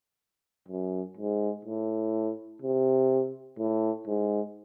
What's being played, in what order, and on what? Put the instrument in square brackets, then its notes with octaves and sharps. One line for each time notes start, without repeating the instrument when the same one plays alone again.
[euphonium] F#2
G#2
A2
C3
A2
G#2